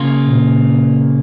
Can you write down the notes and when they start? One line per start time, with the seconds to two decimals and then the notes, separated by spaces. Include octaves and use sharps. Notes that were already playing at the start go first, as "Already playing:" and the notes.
Already playing: C#3 A#3 F4
0.25 A#2